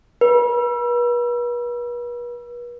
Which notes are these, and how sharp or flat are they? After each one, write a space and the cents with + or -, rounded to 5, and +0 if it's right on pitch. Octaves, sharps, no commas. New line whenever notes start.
B4 -40